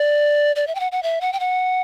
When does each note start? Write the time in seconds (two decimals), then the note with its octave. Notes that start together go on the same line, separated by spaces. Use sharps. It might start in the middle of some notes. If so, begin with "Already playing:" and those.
Already playing: D5
0.56 D5
0.67 E5
0.75 G5
0.80 F#5
0.92 F#5
1.03 E5
1.21 F#5
1.33 G5
1.40 F#5